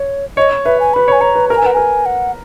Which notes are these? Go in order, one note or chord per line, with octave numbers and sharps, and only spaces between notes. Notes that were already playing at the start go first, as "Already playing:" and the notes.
Already playing: C#5
C#5 D#5
B4 E5
G#5
B4 B5
C#5
G#5
C#5 A#5
B4
A#4 A#5
G#5
B4 F#5
A#4 G#5
F#5